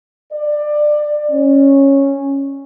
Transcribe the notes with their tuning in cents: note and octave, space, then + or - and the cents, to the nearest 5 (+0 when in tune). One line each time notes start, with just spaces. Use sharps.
D5 +20
C#4 -10